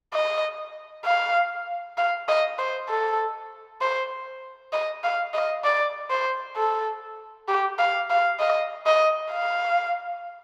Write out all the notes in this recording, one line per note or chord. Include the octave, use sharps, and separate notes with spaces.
D#5
F5
F5
D#5
C5
A4
C5
D#5
F5
D#5
D5
C5
A4
G4
F5
F5
D#5
D#5
F5